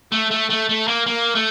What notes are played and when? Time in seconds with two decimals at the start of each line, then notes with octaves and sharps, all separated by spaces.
0.12 A3
0.31 A3
0.50 A3
0.69 A3
0.88 A#3
1.07 A#3
1.35 A3